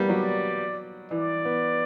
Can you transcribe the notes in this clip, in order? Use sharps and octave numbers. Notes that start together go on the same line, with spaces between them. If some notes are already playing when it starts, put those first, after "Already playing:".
Already playing: G3 A#3 B3
F#3 D5
E3 D5
B3